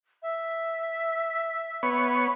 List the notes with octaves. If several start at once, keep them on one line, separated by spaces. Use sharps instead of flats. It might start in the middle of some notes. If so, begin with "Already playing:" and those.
E5
B3 C#5